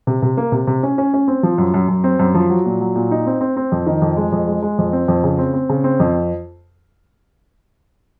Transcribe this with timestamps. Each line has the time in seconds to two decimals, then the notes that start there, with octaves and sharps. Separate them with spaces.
0.07 C3
0.22 C3
0.37 A#3
0.52 C3
0.67 C3
0.83 C#4
0.98 C#4
1.14 C#4
1.28 C4
1.43 F3
1.58 F#2
1.74 F#2
1.88 F#2
2.04 C4
2.19 F#2
2.34 F3
2.50 F#3
2.65 A#2
2.81 F#3
2.96 A#2
3.11 D#4
3.26 C4
3.41 C4
3.57 C4
3.72 F2
3.86 D#3
4.02 F2
4.17 G#3
4.32 F2
4.48 G#3
4.62 G#3
4.78 F2
4.93 C4
5.08 F2
5.24 C#3
5.38 C4
5.54 C4
5.69 C#3
5.84 C4
6.00 F2